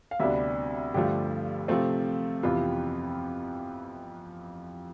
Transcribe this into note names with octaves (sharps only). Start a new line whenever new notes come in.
F5
D2 C3 G3 B3 D4 E5
G2 D3 F3 A3 G4
C3 F3 A3 C4
F2 C3 E3 B3 F4